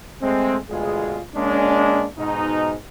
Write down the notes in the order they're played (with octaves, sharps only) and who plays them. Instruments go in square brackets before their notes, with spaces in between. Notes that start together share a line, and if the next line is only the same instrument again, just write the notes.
[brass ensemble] G#3 A3 C4
G1 D2 B2 G#3 F4 G#4
G#3 A#3 C#4 D4
G#2 B2 D#4